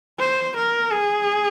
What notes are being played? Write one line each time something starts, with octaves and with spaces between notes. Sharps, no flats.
C5
A#4
G#4